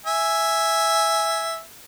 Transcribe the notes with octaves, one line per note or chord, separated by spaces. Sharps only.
E5 G#5